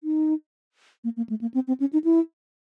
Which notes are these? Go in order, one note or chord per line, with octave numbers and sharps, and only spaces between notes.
D#4
A#3
A#3
A3
A#3
C4
C4
C#4
D#4
E4